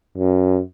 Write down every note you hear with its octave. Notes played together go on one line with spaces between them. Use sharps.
F#2